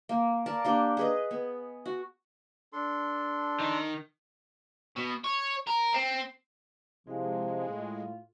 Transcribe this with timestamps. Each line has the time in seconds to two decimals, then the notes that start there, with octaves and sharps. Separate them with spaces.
0.09 A#3
0.46 A#4 D5 F5 A5
0.65 A#3 D4 G4
0.97 G#4 B4 D#5
1.31 B3
1.86 F#4
2.73 D4 A4 C6
3.60 D#3
4.96 B2
5.24 C#5
5.67 A#4
5.94 C4
7.07 C3 F3 G#3 E4 F5
7.68 A2 F4